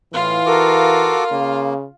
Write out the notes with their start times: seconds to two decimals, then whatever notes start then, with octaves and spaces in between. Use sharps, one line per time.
0.13 A2 E3 F4 F5
0.46 F#4 A4 A#4 D6
1.31 C#3 A#3